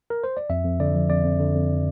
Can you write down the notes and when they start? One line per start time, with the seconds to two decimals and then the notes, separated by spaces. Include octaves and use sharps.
0.10 A#4
0.24 C5
0.37 D5
0.50 F2 E5
0.64 F2
0.80 D3 D5
0.95 F3
1.10 F2 D5
1.25 F2
1.40 D3
1.55 F2